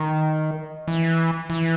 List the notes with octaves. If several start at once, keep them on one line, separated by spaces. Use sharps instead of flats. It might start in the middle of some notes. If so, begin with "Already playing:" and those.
Already playing: D#3
E3
E3